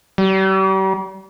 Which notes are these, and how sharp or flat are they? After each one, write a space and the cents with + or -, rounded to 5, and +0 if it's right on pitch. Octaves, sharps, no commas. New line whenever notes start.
G3 -40